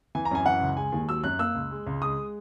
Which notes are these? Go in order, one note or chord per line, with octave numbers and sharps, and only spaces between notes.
E3 G#5
A#5
F#2 G#5
E3 F#5
C#2
G#3 G#5
D#2
F#3 E6
F#2 F#6
A#3 E6
C#2
G#3
C#2
G#3 D#6